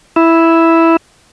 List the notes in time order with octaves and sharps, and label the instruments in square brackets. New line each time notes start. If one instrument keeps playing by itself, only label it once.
[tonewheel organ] E4